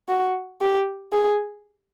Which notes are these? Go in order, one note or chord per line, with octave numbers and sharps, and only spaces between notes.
F#4
G4
G#4